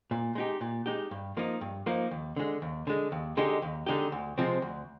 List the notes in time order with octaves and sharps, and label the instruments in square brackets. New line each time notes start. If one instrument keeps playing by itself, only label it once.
[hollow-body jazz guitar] A#2
G#3 D#4 G4
A#2
G#3 D#4 G4
G2
F3 A#3 D#4
G2
F3 A#3 D#4
D#2
D3 G#3
D#2
D3 G#3
D#2
D3 G#3 D#4 G4
D#2
D3 G#3 D#4 G4
D2
C3 F3 G#3 C4
D2